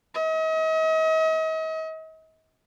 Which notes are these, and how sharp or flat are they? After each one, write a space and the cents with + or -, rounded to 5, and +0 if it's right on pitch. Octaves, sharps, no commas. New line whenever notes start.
D#5 +40